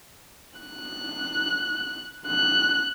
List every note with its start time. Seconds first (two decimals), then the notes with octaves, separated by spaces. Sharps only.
0.60 F#6
2.27 F#6